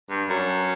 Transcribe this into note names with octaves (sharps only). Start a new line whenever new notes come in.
G2
F#2